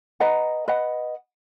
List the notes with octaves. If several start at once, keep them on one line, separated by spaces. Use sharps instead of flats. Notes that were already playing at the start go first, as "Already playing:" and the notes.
B4 D#5 F#5 A#5
B4 D#5 F#5